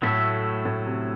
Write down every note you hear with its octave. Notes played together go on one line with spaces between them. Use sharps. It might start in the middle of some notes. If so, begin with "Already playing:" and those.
A2 F#3 A3 E4 A4 E5
A2
C3